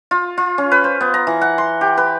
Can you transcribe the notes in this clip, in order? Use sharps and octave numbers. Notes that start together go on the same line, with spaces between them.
F4
F4
C#4
B4
C5
B3
A#5
E3
F#5
C6
G4
B4